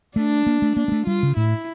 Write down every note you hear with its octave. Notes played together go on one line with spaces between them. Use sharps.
A3 D4
A#3
A3
A#3 D4
A#3
A3
G3 F4
C#3
A2 E4